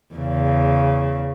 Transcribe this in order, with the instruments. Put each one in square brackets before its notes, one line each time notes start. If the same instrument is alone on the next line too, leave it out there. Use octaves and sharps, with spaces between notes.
[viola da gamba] E2 C#3